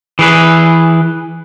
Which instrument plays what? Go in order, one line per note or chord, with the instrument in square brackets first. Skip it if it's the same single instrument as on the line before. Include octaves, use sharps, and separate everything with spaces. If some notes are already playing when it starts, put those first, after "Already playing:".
[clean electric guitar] E3 G#4 B4